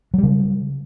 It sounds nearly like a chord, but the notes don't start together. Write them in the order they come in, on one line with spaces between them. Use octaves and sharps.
F#3 G3 C#3